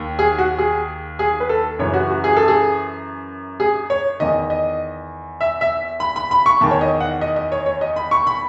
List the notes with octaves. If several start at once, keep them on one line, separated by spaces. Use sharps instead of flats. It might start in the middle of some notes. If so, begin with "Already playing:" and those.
Already playing: D#2 D#3
G#4
F#4
G#4
G#4
B4
A4
F#2 C#3 E3 C#5
F#4
F#4
G#4
A4
G#4
G#4
C#5
E2 D#3 D#5
D#5
E5
E5
B5
B5
B5
C#6
E2 D#3 A5
C#5
D#5
F#5
D#5
D#5
C#5
C#5
D#5
B5
C#6
B5